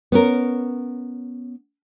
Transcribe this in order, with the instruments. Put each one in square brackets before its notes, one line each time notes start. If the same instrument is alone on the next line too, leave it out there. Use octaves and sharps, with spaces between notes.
[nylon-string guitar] B3 C#4 A#4